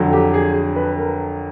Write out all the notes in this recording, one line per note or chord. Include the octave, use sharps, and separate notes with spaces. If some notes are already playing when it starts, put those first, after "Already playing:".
Already playing: F2 D3 F#3
G4
G#4
B4
A#4